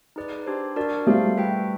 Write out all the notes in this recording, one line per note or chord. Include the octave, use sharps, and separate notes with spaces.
D#4 G#4 B4 D5
D4 G4 C5
D4 F#4 A#4 D5
G3 A3 G#4 C5 F5
F#4 B4 E5 G5